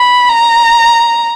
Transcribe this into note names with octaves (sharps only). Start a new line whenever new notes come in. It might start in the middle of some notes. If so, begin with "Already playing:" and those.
Already playing: B5
A#5